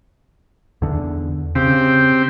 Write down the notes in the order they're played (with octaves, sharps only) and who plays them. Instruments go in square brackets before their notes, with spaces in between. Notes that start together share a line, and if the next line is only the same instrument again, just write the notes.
[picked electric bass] E2 D3
[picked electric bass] C#3 [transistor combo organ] C4 G4